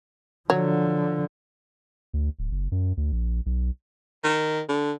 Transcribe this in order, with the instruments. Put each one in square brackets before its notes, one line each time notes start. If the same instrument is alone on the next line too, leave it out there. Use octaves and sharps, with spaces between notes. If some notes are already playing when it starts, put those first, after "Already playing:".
[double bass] D3 F3 [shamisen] F#3
[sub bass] D2
D1
F#1
F#2
D2
A#1
B1
[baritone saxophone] D#3
D3